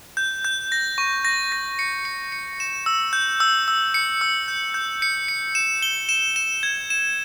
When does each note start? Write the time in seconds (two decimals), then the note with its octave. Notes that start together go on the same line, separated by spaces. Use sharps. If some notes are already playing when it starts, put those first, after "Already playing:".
0.17 G6
0.45 G6
0.72 A#6
0.98 C#6
1.25 A#6
1.52 A#6
1.79 C#7
2.05 C#7
2.32 C#7
2.60 E7
2.86 E6
3.13 G6
3.40 E6
3.68 E6
3.94 C#7
4.21 E6
4.48 G6
4.74 G6
5.02 C#7
5.28 C#7
5.55 E7
5.82 G7
6.09 E7
6.36 E7
6.63 G#6
6.90 E7